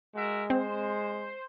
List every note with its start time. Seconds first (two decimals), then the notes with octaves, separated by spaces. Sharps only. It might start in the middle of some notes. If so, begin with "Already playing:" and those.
0.15 G#3 F#4 A#4 E5
0.50 C4 C5